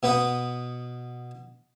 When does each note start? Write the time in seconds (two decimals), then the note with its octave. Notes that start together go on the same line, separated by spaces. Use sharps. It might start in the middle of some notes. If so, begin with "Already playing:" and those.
0.03 B2 B3 B4 F#5 D#6